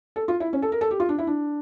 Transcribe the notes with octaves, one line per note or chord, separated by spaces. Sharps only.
A4
F4
E4
C#4
A4
A#4
A4
G4
F4
D4
E4
D4